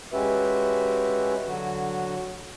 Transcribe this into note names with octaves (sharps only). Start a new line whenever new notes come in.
G#3 C#4 F#4 G4 B4 E5
D3 F#3 F#4